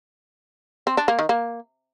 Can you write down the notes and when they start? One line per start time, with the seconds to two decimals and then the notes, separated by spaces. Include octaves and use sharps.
0.87 C4
0.97 D4
1.08 A#3
1.19 D#3
1.29 A#3